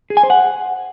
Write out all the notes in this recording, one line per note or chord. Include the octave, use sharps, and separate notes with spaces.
G#4
G#5
C5
F#5